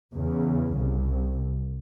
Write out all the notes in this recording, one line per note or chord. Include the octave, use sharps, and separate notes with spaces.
E2 C#3
C2